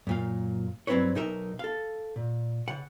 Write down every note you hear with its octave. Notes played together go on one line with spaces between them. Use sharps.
F#2 A#2 F5
G2 F#3 C4 E4 B4 C#5
B1 D#4 A#4 E5
A4 F5
A#2
C#3 F#5